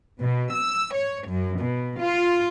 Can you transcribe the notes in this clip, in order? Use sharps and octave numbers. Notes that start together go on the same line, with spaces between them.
B2
E6
C#5
F#2
B2
F4